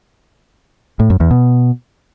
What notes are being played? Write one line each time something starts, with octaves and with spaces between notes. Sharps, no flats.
A2
F#2
E2
B2